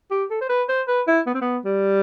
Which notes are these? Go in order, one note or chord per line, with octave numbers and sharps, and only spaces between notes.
G4
A4
C5
B4
C5
B4
E4
B3
C4
B3
G3